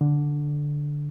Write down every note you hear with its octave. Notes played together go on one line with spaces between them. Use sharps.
D3